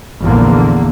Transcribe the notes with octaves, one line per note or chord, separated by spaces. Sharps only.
A#1 E2 D3 A#3